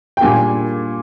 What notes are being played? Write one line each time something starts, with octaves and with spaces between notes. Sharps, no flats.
G5
A#2 G3 A#3 D4 G#5